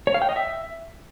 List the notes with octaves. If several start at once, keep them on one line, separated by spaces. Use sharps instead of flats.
C#5
F5
G5
D#5
E5